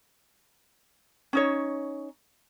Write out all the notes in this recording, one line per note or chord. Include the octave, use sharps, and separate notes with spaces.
C#4 D#4 C#5